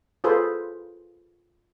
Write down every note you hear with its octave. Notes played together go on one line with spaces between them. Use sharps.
F4 G#4 A4 B4 C5